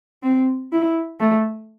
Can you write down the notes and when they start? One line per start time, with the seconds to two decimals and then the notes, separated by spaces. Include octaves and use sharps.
0.23 C4
0.72 E4
1.20 A3